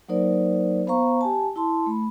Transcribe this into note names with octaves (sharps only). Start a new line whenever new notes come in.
F#3 A#3 D#4 A#4 C5 D5
B3 C5 F5 A#5 C#6
G4 G#5 A5
E4 A5 C6
A3 B5